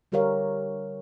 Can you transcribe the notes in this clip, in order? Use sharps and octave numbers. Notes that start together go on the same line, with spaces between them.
D3 G3 G4 A#4 C#5 F5